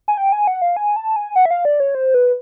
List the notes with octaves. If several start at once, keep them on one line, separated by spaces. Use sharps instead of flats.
G#5
G5
G#5
F#5
F5
G#5
A5
G#5
F#5
E5
F5
D5
C#5
C5
B4